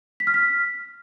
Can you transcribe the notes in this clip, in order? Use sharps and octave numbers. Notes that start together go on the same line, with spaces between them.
B6
F6
B6